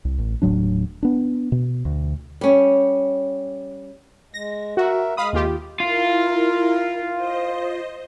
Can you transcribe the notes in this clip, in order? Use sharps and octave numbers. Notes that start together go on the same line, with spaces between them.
C2
A1
D#1 A2 F#3 D4
B3 D4
B2
D2
G3 C#4
G#3 A#6
F#4 A#4 E5
G#3 F5 B5 D#6
D#2 F4 G4
E4 F4 A#4
C5 D#5